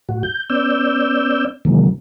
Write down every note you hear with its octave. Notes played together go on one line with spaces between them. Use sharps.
A2 F#4
G6
B3 C#4 D5 E6 G6
C3 D#3 E3 F#3 G#3 A#3